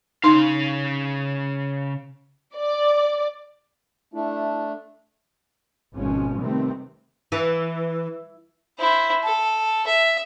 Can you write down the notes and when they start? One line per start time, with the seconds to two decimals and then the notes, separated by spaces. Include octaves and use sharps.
0.24 C#3 D#4 F5 C6
2.56 D5
4.14 A3 D4 E4
5.95 G#1 B2 F3 G#3 C#4
6.39 C3 D#3 G3 A3 B3 C4
7.32 E3
8.79 E4 C5
9.24 A4
9.87 E5